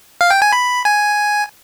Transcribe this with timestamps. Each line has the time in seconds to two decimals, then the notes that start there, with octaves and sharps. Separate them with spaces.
0.21 F5
0.31 G5
0.42 G#5
0.52 B5
0.85 G#5